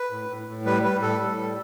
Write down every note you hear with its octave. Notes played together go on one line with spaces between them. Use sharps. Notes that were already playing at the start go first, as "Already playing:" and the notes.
Already playing: B4
A2
A2
A2
G3 B4
G3 B4
A2 A4
A2
G3